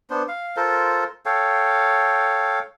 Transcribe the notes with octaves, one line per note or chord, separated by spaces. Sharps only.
B3 D4 C5
F5
F4 A4 A#4 C5
A4 C#5 F5 G5